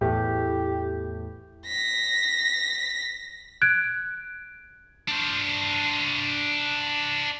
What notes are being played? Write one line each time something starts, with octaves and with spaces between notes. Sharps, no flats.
E2 A2 G4
A#6 B6
F#6 G#6 D7
D4 C5